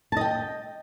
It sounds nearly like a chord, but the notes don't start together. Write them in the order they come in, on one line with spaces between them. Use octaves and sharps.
A5 D#5 G5